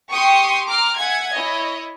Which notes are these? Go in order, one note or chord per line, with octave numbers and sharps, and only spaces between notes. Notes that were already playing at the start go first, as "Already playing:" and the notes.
G4 G5 C6 C#6 D#6
A#5 C6 D6 F6
E5 F#5 G#5 G#6
E4 C#5 D#5